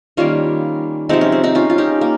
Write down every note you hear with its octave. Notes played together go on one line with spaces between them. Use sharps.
D#3 G3 A#3 C#4 F4
C3 F3 G#3 C4 D#4
C#4
C4
C4 D#4
C#4 F4
F4
D#4 G4
A#3